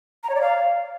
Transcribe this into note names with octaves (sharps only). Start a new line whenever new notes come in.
A#5
C#5
D5
F5